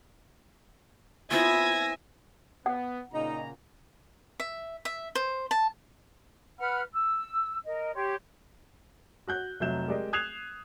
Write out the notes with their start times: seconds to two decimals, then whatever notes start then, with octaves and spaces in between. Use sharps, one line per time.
1.31 B3 C4 E4 F4 E5 G#5 G#6 A#6
2.66 B3 F#5
3.13 A#2 C#3 D#4 A#5
4.40 E5
4.85 E5
5.15 C5
5.51 A5
6.58 B4 F#5 B5 F6
6.92 E6
7.66 A#4 D#5
7.95 G4 C#5 C6
9.27 F#4 F#6 G6
9.60 F1 F#3 E5 G6 E7
9.88 G#3 G4 A#4 D5 D#5
10.13 D#6 F#6 G#6 C7 E7 F7